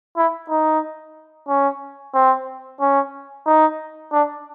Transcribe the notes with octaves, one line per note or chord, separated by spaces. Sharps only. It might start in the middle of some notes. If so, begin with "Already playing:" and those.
E4
D#4
C#4
C4
C#4
D#4
D4